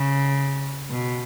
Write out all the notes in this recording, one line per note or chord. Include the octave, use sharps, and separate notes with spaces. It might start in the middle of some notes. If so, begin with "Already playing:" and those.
Already playing: C#3
B2